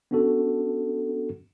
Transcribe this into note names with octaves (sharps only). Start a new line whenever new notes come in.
B3 C#4 D4 F#4 A4